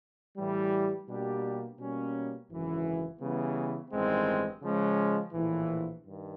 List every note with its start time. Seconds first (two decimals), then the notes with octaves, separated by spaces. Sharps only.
0.37 A2 E3 G3
1.08 B2 G3 A#3 D4 G4
1.79 B2 G3 A#3 C#4
2.49 G#1 F#2 C#3 E3
3.20 C#3 E3 G3 B3
3.91 A1 G2 D#3 G#3 C4
4.62 C#3 F3 G#3 C#4
5.33 A#1 A2 E3
6.04 G2 D#3